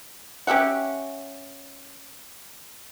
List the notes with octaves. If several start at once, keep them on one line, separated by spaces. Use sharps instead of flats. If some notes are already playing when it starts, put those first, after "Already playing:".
C#4 G4 E5 F#5